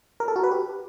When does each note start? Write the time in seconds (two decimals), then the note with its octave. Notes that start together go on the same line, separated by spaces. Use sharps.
0.20 A#4
0.28 A4
0.36 F#4
0.43 B4
0.51 G4